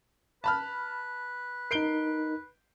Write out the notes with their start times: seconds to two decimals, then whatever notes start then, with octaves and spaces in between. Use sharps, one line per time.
0.44 B4 A5 B5 F6
1.71 D#4 A#4 C7 D7 G7